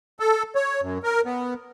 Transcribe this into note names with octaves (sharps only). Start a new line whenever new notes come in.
A4
C#5
F#2
A#4
B3